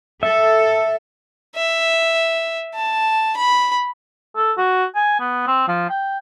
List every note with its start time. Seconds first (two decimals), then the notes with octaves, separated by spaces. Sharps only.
0.23 A4 E5
1.56 E5
2.75 A5
3.37 B5
4.36 A4
4.58 F#4
4.95 G#5
5.20 B3
5.47 C4
5.68 F3
5.90 G5